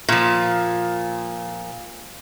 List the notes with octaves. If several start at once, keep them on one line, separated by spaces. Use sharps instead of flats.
A#2 F3